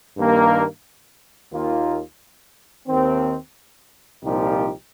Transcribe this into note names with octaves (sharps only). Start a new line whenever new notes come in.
G2 D#3 A#3 G4
D#2 D#3 A#3 F4
D#2 D#3 C4
C2 A#2 F3 D#4 G4